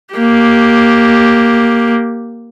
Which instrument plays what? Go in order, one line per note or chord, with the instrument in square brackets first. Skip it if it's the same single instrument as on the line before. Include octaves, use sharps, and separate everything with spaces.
[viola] A#3 G4